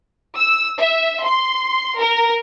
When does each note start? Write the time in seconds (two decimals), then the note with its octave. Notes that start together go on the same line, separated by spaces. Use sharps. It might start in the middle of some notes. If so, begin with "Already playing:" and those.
0.37 E6
0.80 E5
1.25 C6
2.00 A#4